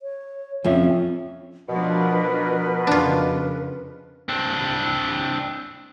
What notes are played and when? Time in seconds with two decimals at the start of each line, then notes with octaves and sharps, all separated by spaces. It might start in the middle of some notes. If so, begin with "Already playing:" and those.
0.02 C#5
0.64 F2 F3 C4 C#4 F4 E5
1.69 B2 F3 D4 A#4 B4
2.87 F2 C#3 D4 F4
4.29 C4 D4